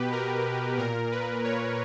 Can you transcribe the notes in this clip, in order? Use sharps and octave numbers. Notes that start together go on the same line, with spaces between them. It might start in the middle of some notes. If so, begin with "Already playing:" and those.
Already playing: B2 G4 B4
A#4
A#2 A#4
B4
C#5